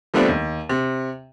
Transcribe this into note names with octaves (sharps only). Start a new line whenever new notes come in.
F3 G3 A3 B3 C4 D4
D#2
C3